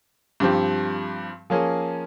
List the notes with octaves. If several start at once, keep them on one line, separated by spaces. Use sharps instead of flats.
G2 F3 C4 G4
F3 A#3 C#4 G#4